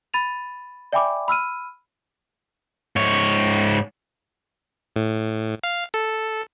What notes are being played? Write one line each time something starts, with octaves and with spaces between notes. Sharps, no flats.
B5 A6 D#7 F7
D5 E5 G5 G#5 B5 D6
B5 E6 F6 D#7
G#2 C#5
A2
F5
A4